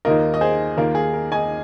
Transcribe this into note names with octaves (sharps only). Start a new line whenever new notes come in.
D#2 D#3 A#3 F4 A#4 D#5
D#5
G#4 C5
D#2 D#3 A#3 F4 A#4
G#4
A#4
D#5 G#5